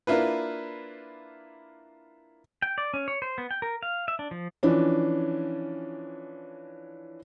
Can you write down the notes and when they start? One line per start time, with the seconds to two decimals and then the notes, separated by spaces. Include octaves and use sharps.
0.07 A#3 D4 E4 F4 B4
2.62 G5
2.78 D5
2.94 C#4
3.08 C#5
3.22 C5
3.38 B3
3.51 G5
3.62 A#4
3.83 F5
4.08 E5
4.19 D4
4.31 F3
4.63 E3 F3 C#4 D4